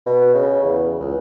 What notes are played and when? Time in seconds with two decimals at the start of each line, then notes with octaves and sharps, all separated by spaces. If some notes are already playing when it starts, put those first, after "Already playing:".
0.06 B2
0.34 C#3
0.63 E2
1.00 C#2